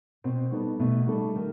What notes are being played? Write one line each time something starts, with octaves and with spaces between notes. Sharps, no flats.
B2 C4
G3 B3 D#4 A4
B2 A3
G3 D#4 A4
D#3